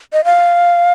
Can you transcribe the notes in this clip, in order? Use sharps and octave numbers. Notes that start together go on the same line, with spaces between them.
D#5
F5